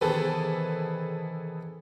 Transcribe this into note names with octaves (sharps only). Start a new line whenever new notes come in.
E2 C3 D#3 G#4 A4 B4